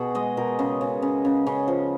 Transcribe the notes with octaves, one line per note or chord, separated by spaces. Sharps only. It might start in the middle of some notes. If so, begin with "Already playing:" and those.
Already playing: B2 F#4 G#4
G#3 D#5
B2 A#4
C#3
C#3
C#3
C#3
C#3
F3